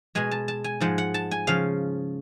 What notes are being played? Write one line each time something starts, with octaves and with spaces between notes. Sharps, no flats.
B2 G#3 G#5
A5
A5
G#5
G#2 F3 G#3 F#5
F#5
A5
G#5
C#3 F3 F5